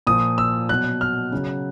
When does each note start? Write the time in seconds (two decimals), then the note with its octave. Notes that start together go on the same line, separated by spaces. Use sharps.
0.07 A#2 F3 D#6
0.38 E6
0.69 B2 F#3 F#6
1.01 F6
1.32 C#3 F#3